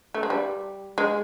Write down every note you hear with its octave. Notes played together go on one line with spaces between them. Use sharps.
A3
G#3
G3
G#3